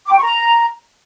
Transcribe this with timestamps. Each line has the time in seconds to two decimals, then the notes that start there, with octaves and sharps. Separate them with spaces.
0.07 D6
0.13 G5
0.18 C#6
0.24 A#5